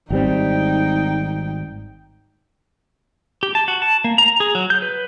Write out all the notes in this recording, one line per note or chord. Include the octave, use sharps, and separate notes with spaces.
G#1 G3 C4 D#4 G5
G4
A5
F#4
A5
A#3
A#5
G#4
F#3
G6
B4